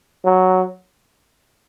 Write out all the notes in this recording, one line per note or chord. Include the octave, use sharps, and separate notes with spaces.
F#3